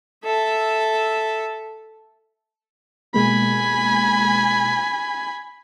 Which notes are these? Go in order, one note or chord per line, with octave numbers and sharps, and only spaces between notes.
A4 E5
B2 G#3 A#3 G#5 B5